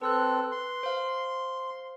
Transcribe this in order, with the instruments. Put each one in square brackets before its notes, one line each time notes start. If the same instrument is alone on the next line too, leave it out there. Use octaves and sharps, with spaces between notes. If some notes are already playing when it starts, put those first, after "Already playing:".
[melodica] C4 A4 [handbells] B4 E6 F#6
[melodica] C6
[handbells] C5 F5